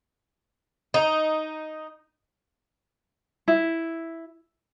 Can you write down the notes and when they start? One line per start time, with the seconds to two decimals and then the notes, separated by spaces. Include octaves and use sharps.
0.94 D#4
3.48 E4